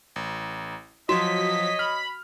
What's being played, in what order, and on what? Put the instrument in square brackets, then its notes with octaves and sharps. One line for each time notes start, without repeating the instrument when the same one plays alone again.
[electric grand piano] A1
[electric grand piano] F3 F#3 E7 [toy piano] F#4 [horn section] C#5 D#5 [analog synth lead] B6
[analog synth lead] B5 [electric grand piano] F6